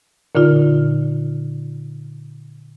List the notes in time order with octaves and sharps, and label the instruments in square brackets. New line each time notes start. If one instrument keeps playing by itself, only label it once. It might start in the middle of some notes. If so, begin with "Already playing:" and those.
[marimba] A#2 D3 D#4 F4